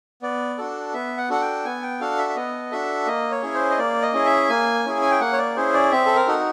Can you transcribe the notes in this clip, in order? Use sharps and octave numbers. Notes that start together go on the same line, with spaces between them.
B3 D5
D4 F#4 A4
B3 E5
F#5
D4 F#4 A4 F#5
G5
B3 G#5
G5
D4 F#4 A4 F5
E5
E5
B3 D#5
D4 F#4 A4 E5
A#3 D#5
C#5
C#4 E4 G#4
C5
D#5
A#3 D5
D#5
C#4 E4 G#4
E5
A#3 G#5
C#4 E4 G#4
G#5
G5
A#3 F#5
C#5
D5
C#4 E4 G#4 C5
D5
C4 E5
A4
A#4
D#4 F#4 A4